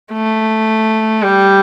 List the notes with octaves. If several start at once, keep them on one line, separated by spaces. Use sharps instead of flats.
A3
G3